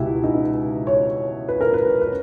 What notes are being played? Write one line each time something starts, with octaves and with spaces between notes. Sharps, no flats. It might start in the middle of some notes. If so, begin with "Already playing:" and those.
Already playing: C#2 B2 E4 G4
D#4
C#5
B4
A#4
B4
B4